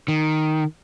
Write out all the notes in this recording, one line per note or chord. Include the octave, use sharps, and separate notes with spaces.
D#3